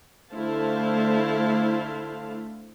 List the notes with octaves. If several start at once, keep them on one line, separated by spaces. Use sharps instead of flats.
D3 A3 E4 C5 F5 A5